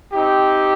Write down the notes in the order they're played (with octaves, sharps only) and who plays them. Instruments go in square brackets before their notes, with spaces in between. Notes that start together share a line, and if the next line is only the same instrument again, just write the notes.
[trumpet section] C4 D#4 G4